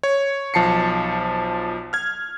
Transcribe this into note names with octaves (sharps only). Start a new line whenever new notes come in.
C#5
B1 F3 A5 C7 C#7
F6 G#6